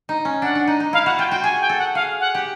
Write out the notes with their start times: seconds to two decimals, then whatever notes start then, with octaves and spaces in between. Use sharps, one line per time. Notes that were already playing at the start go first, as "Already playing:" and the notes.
0.09 D#4
0.25 C#4
0.42 D4 F#5
0.55 D4
0.68 D#4
0.80 D#4
0.93 E4 F5
1.06 F#4 F#5
1.18 F4 G5
1.31 F#4 G5
1.44 G#4 G#5
1.61 G5
1.69 A4
1.78 F#5
1.95 G#4 F5
2.20 F#5
2.35 G4